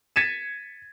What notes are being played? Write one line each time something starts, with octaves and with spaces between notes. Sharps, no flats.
G#6 A6 B6 C#7 D#7 E7